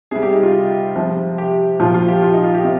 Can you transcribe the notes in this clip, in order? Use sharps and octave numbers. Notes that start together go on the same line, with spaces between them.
C3 G3 G#4
G4
D#4
F4
C3 F3
G4
A#2 F3 F4
F4
G4
F4
D#4
F4
G4
C3